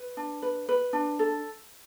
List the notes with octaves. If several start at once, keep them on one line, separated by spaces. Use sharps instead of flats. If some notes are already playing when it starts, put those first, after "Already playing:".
Already playing: B4
D4
B4
B4
D4
A4